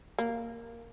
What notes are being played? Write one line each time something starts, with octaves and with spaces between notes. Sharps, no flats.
A#3